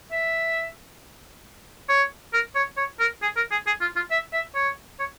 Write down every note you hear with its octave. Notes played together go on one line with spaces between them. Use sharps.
E5
C#5
A#4
C#5
C#5
A#4
G#4
A#4
G#4
G#4
F4
F4
E5
E5
C#5
C#5